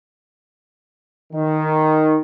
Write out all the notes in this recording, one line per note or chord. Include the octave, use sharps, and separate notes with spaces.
D#3